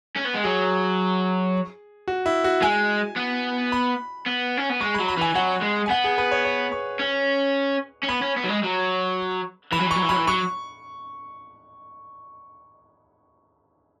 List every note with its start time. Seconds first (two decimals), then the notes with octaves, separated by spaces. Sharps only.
0.16 C#4
0.24 B3
0.34 G#3
0.44 F#3 G#4
2.08 F#4
2.26 E4
2.44 F#4
2.62 G#3 G#5
3.17 B3
3.72 B5
4.26 B3
4.57 C#4
4.69 B3
4.80 G#3 C#6
4.94 B5
4.99 F#3
5.08 B5
5.17 E3 G#5
5.35 F#3 F#5
5.62 G#3
5.86 G#5
5.90 B3 F#5
6.04 G#4
6.18 B4
6.32 C#5
6.45 C#5
6.72 C#6
7.00 C#4
8.03 C#4
8.09 B3 B5
8.22 C#4
8.37 B3
8.44 F#3
8.49 G#3
8.64 F#3
9.72 E3 B5
9.81 F#3
9.87 E3
9.91 F#3 C#6
10.03 E3
10.09 F#3 B5
10.16 E3
10.27 F#3 C#6